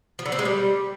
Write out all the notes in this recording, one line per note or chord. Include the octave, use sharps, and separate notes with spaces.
F3
D3
C4
G#3
G3